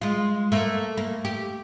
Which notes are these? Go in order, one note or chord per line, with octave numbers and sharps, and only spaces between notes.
G#3 F4
A3 A#3
A#3
G4